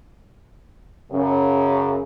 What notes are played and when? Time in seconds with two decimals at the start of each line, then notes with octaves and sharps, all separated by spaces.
1.12 F#2 C#3